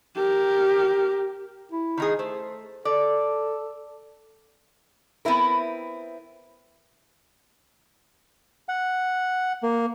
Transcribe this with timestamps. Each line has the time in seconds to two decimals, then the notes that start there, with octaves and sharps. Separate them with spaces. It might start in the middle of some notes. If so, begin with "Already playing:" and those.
0.16 G4 A#4
1.72 E4
1.97 D#3 D#4 G#4
2.19 A3 C5
2.85 A4 D5
5.25 B3 C4 E4 A#4
8.69 F#5
9.63 A#3